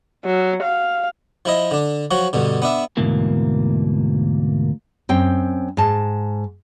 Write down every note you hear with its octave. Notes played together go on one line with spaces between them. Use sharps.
F#3
F5
F3 E4 D#5
D3 D4
F3 F#3 F#4
G2 B2 D3
B3 D4 E5
D2 G#2 B2 E3 A#3
F#2 C4 G5
G#2 A5